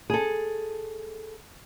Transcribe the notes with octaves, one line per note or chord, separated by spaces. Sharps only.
G#4 A4